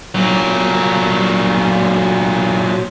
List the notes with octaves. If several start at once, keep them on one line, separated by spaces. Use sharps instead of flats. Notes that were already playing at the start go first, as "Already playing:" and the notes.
A#2 F#3